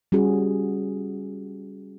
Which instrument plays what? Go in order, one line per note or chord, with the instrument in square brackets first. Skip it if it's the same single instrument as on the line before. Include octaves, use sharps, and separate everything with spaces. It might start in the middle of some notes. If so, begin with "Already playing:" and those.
[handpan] G3 C#4 F#4 G#4